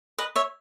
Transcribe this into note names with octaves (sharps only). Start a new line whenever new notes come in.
B4 D#5
C#5 E5